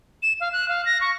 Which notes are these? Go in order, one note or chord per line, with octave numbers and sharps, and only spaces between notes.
E7
F5
F#6
F5
A#6
C#6